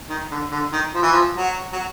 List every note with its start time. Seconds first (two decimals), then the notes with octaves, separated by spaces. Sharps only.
0.10 D#3
0.31 D3
0.52 D3
0.73 D#3
0.94 F3
1.02 E3
1.12 F3
1.37 F#3
1.73 F#3